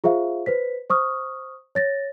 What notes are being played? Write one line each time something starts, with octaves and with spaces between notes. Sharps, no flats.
F4 G#4 C5 E5 F5
B4 C5 B6
C5 C#6 D#6 F6
C#5 A6 A#6